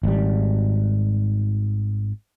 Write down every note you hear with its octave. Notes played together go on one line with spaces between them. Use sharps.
G#1 G3